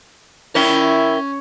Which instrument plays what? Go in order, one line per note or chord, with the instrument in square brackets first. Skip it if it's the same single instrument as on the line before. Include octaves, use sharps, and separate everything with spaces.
[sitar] C#4 [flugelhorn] E4 [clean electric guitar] A#4 E5 G5